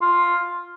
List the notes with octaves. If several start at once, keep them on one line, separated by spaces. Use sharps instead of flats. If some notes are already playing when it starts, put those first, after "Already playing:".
F4